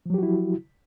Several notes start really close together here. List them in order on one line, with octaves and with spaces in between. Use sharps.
F3 F#3 G4 F#4 E4